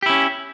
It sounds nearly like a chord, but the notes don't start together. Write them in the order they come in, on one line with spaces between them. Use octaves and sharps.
G4 E4 C#4